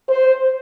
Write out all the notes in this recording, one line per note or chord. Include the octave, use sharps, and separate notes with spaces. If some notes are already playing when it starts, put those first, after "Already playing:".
C5